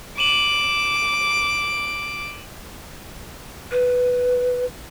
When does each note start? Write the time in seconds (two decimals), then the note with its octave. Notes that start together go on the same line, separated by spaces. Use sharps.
0.18 D6 D#7 E7 F#7
3.72 B4